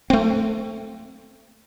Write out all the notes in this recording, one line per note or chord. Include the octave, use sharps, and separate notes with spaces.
A3 C4